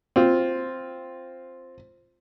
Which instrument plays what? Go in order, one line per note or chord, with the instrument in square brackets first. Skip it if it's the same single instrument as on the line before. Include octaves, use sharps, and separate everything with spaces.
[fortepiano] C4 F4